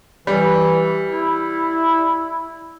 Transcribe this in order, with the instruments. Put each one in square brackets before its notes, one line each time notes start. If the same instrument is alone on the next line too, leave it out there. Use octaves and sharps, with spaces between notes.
[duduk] E3 [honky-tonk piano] G3
[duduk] E4